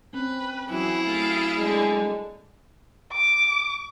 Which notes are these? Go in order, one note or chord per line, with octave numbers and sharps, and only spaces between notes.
C4 C#4 B4
E3 F#3 C#4 E4 F#4 G#4
A3 G4 F5 G6 A6
D3 G3 G#3
D6